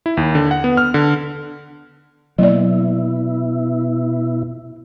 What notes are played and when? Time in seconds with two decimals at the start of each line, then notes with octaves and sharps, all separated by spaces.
0.06 E4
0.17 D#2
0.35 D3
0.51 F#5
0.64 B3
0.77 F6
0.94 D3
2.38 B2 F#3 A#3 E4 D5 D#5